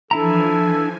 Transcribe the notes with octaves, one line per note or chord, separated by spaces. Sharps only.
E3 F3 D4 E4 A4 G#5 A#5